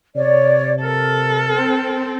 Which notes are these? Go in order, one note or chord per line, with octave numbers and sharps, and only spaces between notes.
C3 C#5 D5
A4 A#4
C4